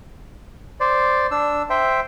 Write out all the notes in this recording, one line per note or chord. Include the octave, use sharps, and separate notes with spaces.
C5 D5
D4 E6
C5 E5 G5